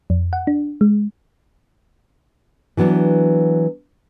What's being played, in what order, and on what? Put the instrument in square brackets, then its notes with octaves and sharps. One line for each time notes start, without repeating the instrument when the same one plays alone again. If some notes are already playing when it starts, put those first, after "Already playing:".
[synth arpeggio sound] F2
F#5
D4
G#3
[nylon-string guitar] E3 F#3 B3 D4